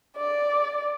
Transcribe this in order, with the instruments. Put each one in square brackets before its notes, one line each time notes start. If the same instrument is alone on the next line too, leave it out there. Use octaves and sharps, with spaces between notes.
[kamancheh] D5